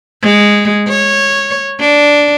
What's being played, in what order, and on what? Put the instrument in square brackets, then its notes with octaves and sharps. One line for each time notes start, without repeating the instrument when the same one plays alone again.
[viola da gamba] G#3
C#5
D4